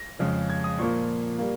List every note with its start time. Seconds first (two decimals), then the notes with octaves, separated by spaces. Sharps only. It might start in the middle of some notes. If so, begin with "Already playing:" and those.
Already playing: A#6
0.19 F2 C#3 G#3
0.50 G#6
0.64 D#6
0.79 A#2 F3 A#3 C#6
1.38 G3 A#3